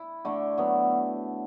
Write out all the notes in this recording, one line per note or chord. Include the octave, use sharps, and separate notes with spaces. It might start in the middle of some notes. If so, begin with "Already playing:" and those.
Already playing: E4
D3 A3 E4
F#3 B3